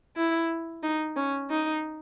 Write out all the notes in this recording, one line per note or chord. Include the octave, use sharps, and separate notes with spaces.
E4
D#4
C#4
D#4